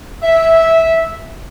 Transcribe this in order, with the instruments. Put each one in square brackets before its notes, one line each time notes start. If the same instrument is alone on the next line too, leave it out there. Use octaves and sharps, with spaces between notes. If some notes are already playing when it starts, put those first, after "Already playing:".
[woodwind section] E5